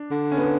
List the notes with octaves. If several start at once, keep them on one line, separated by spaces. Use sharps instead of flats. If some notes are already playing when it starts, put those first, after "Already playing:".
Already playing: D4
D3
C#4
B3